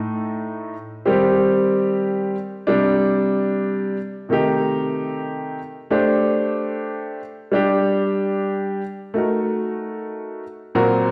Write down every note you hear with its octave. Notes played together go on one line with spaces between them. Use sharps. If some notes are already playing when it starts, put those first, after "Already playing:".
Already playing: A2 A3 D#4
D#3 G3 C4 G4 C5
C3 G3 D4
C3 D#3 A3 D#4 G4
A3 D4 G4 C5
G3 D4 G4
A3 D#4 F#4 A#4
A#2 F#3 C4 F#4 A#4